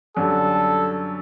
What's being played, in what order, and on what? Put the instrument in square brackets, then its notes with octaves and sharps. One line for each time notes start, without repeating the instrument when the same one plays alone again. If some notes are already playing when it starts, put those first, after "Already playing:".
[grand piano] F#2 D3 G3 [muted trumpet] A4